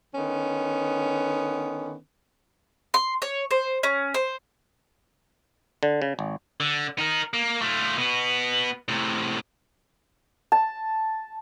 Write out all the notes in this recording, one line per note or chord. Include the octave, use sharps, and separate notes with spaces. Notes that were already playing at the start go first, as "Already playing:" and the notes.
D3 D#3 B3 C#4
C6
C#5
C5
C#4
C5
D3
C#3
G#1
D3
D#4 A#4
A#3
A3 F4
B2 B3
A2 C3
A5